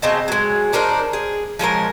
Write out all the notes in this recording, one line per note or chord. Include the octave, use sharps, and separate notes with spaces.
C#3 C4 D#5 A5
F#3 G#3
D4 D#4 A#4 C5
G#4
F3 G#3 C#4 A#4